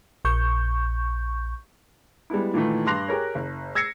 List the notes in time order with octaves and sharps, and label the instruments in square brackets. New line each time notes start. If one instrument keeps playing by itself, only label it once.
[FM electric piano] A#1 C#6 G6
[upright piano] G3 G#3 B3 E4
A#2 D#3 E3 A3
G2 C6 D6 F#6 A#6 F7
G4 G#4 A#4 C#5
F#1
E6 G#6 A#6 C7 C#7